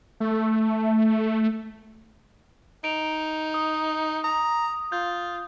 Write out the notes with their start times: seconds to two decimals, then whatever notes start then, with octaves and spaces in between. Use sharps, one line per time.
0.20 A3
2.84 D#4 D7 F7
3.54 D#6
4.24 A#5 D#6
4.92 F4 G6